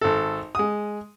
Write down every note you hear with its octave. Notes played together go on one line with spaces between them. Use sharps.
G#1 A4
G#3 D#6